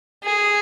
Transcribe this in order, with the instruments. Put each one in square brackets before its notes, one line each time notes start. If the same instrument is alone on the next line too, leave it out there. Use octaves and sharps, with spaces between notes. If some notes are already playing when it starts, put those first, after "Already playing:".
[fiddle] G#4